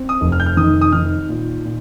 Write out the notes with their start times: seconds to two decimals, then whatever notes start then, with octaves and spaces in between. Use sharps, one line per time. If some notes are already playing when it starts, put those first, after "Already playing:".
Already playing: C4
0.09 D#6
0.21 F1
0.32 F6
0.40 G6
0.46 F6
0.57 D#3 D#6
0.81 D#6
0.92 D#3 F6
1.29 A#2
1.65 A#2